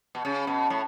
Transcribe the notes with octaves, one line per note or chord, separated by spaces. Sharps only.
B2
C#3
B2
A2